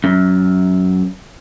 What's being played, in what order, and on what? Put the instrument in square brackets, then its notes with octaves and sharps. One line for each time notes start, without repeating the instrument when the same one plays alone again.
[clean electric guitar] F#2